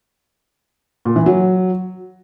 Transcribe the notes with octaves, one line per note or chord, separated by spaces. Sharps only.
A#2
E3
F#3